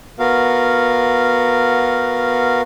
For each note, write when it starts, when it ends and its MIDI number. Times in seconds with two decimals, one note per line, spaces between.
0.19 2.61 59
0.19 2.61 66
0.19 2.61 70
0.19 2.61 77